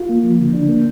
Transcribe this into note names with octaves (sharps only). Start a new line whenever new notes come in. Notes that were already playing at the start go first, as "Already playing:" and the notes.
Already playing: F4
A#3
F3
D3
D4
A#3